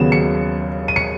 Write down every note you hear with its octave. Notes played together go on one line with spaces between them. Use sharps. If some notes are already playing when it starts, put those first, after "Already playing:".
Already playing: D#2 C#3 F#3 B3 E7
C#7
D#7
C#7